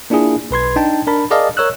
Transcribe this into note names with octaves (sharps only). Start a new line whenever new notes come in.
A#3 D4 E4 F4 G#4
B1 B4 C6 G#6
D4 D#4 G5 A5
D4 A#4 A5 B5
G#4 A#4 D5 D#5 F5 A5
A#4 C#5 E6 F#6